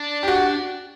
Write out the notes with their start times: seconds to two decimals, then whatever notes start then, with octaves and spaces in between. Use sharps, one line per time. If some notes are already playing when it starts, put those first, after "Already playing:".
Already playing: D4
0.23 G4
0.28 F#4